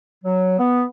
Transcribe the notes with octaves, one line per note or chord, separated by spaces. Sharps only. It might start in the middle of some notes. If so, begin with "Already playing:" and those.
F#3
B3